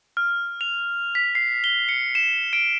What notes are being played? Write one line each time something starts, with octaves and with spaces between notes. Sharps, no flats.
F6
F7
B6
C7
G7
C#7
E7
D7